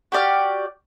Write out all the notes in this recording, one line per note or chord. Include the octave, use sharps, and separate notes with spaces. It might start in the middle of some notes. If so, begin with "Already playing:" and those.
F#4 G4 D5 F6